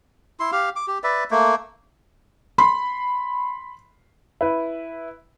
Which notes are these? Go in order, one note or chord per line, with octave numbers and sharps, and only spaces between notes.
E4 C6
G4 F5
D6
G4
B4 D5 E5
A3 A#3
B5 C6
E4 B4